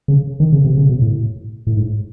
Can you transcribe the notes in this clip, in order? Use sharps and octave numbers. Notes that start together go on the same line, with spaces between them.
C#3
D#3
C#3
C3
C#3
B2
A2
A2
G#2